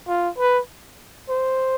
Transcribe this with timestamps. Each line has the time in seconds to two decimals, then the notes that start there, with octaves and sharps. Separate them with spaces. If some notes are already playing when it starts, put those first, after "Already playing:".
0.08 F4
0.39 B4
1.30 C5